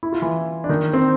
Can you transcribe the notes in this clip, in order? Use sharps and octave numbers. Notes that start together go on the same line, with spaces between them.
E4
F4
E3 E4
D4
D#3 D#4
C4